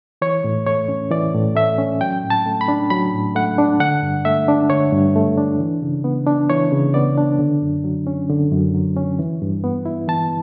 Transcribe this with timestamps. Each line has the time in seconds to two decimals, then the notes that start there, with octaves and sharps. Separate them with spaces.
0.22 E3 C#5
0.44 A2
0.66 A3 C#5
0.88 C#4
1.11 E3 D5
1.34 A2
1.55 A3 E5
1.78 C#4
2.01 F#3 G5
2.24 A2
2.30 A5
2.46 A3
2.61 B5
2.68 D4
2.90 F#3 B5
3.14 A2
3.35 A3 F#5
3.58 D4
3.80 D3 F#5
4.02 G2
4.25 A3 E5
4.48 D4
4.70 D3 C#5
4.92 G2
5.16 A3
5.38 D4
5.60 E3
5.83 C#3
6.04 B3
6.27 D4
6.50 E3 C#5
6.72 C#3
6.94 B3 D5
7.17 D4
7.39 D3
7.62 F#2
7.84 F#3
8.07 C#4
8.30 D3
8.52 F#2
8.75 F#3
8.97 C#4
9.19 E3
9.42 G2
9.64 B3
9.85 E4
10.08 E3 A5